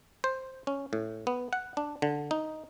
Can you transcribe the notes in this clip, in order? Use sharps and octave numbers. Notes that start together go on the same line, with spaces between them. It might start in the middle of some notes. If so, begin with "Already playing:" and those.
C5
C#4
A2
B3
F#5
D4
D3
D#4